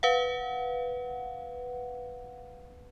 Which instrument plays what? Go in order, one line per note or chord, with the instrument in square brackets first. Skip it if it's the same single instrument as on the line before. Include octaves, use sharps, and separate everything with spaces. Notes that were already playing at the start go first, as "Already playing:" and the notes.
[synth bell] B4 F5 F#5